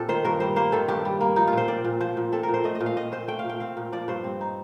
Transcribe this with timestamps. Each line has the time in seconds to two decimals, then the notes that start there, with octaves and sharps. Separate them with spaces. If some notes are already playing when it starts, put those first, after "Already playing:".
Already playing: A#2 C4 A4
0.09 D#3 C5
0.25 G2 A#4
0.40 G3 C5
0.56 A#3 C5
0.72 D#3 A4
0.88 G2 G4
1.05 G3
1.21 A#3
1.36 F3 D#4
1.47 F4
1.53 A#2 C5
1.68 C4 D5
1.84 A#2
2.00 F3 C5
2.17 A#2
2.32 C4 A4
2.43 A#4
2.48 A#2
2.54 C5
2.64 A3 D#5
2.75 D#5
2.81 A#2
2.86 F5
2.96 C4 D#5
3.12 A#2 C5
3.28 A3 G5
3.39 F5
3.44 A#2
3.49 G5
3.60 C4 F5
3.77 A#2
3.92 F3 D5
4.08 G2 C5
4.24 C4
4.41 D#4